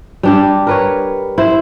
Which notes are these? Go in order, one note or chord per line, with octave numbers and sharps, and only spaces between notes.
G3 D4 G4
A#4 B4 C#5
E4 C5